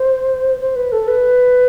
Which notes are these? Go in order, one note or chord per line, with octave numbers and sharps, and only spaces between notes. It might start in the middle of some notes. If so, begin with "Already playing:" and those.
Already playing: C5
C5
B4
A4
B4